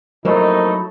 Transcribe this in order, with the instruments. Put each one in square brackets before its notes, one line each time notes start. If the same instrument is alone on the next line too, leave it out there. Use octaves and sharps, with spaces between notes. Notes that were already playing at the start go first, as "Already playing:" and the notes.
[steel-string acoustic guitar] F2 A#3 [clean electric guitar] F#3 E4 [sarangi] A3 [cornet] D#4